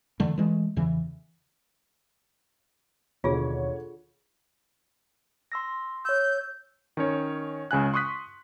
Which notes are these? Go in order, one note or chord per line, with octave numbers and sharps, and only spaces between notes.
F2 D3 E3 A3
E3 G#3 A3
E2 C#3 E3
D#2 B2 D3 F4 G#4 C#5
C6 E6 A#6
C#5 E6 G6
D#3 C#4 C#5
C#2 C#3 G#5 F#6
C6 C#6 D#6 F#6 B6